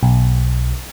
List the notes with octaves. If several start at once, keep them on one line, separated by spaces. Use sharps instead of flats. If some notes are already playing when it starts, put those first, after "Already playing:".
B1